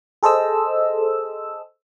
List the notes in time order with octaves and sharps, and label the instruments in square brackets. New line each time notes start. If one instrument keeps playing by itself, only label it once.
[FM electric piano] G#4 A4 C5 D#5 E6